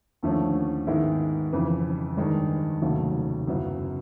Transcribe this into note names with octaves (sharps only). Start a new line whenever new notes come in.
D#2 D3 F3 A3 C#4
G#2 D#3 G#3 B3 E4
F2 C#3 E3
G2 D#3 G#3
F1 D#2 C#3 F#3 A3
F#2 C#3 F#3 B3 E4